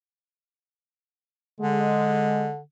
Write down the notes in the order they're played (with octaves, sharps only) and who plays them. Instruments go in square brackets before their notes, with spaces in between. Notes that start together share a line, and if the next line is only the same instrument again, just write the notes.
[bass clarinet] D3 [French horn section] G#3